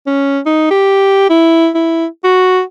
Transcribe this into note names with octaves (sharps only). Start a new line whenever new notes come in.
C#4
D#4
G4
E4
E4
F#4